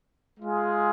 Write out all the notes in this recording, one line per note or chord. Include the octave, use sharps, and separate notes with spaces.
G#3 F4 G#4